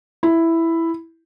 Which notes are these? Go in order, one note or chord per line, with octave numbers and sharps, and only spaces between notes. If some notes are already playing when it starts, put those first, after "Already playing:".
E4